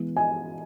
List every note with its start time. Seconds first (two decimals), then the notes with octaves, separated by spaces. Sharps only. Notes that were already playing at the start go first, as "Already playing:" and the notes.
Already playing: E3 G#3 B3
0.17 G#5